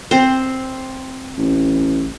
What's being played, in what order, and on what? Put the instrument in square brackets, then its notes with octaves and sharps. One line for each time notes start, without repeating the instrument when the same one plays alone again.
[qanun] C4 C5
[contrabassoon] A1